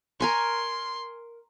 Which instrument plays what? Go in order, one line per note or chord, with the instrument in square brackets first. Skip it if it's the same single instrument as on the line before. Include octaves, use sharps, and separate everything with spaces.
[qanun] A#4 G#5 C#6 [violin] C6